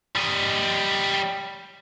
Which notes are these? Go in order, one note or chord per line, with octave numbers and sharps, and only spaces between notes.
G3 D#5